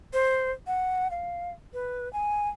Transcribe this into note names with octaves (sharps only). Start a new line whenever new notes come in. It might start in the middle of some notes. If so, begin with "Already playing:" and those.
C5
F#5
F5
B4
G#5